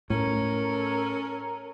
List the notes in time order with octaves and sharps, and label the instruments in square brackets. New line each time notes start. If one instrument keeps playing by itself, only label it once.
[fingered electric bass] A2 [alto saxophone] C#4 [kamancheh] A4 A#4 [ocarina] A#5